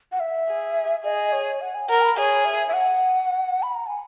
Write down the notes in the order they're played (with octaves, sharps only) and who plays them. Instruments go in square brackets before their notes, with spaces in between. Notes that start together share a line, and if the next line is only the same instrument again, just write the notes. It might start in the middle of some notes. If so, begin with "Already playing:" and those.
[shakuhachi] F#5
E5
[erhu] G#4
[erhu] G#4 [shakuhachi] D#5
[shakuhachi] C#5
F#5
G#5
[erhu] A#4 [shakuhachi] F#5
[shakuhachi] B5
[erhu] G#4 [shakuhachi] C#5
[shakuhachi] E5
E5
F#5
B5
A#5
G#5